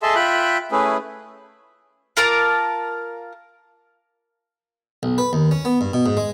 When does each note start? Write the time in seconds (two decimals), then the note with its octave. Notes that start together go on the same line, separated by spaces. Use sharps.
0.02 G#4 A4 D#5 E5 A5 C6
0.15 F4 E5 G5 B5 F#6
0.72 A3 C#4 E4 G#4 B4
2.17 F4 A#4 A5 D6
5.03 B1
5.18 B4
5.33 D#2
5.51 C#4
5.65 B3
5.81 G2
5.93 B2
6.06 G#2
6.17 G#3